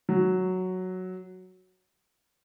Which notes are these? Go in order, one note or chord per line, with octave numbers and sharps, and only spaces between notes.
F#3